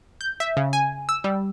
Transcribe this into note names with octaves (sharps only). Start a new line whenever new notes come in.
G6
E5
C#3
G#5
E6
G3